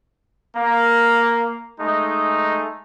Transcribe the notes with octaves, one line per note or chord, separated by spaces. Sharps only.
A#3
G#3 A3 D#4